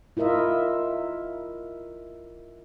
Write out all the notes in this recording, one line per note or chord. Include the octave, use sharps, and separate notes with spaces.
E4 F4 A#4 D#5 E5